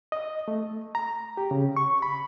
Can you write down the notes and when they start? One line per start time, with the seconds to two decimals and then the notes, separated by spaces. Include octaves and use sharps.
0.12 D#5
0.48 A3
0.95 A#5
1.37 G4
1.51 C#3
1.76 C#6
2.02 B5